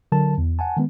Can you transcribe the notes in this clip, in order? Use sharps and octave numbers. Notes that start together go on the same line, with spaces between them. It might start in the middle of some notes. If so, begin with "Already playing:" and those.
D3 F#3 A#4 A5
E2
F#5 G#5 A5
D#3 G#3 B3